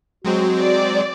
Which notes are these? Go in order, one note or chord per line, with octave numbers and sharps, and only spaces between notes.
F#3 G#3 C4 F#4
D5